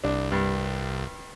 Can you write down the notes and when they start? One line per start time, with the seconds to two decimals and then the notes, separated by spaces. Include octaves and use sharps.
0.04 C2 D4
0.31 G2